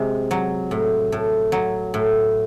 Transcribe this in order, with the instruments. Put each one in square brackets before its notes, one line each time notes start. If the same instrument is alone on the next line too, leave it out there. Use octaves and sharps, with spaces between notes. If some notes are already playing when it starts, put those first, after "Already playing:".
Already playing: [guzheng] C3 G#3
F#3
A2
A2
F#3
A2